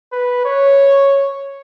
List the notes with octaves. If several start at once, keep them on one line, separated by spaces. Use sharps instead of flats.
B4
C#5